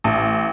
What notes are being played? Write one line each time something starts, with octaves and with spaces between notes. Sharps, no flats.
A1